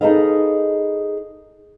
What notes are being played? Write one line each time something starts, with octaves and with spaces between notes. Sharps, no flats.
D#4 G#4 A4 B4 D#5 F5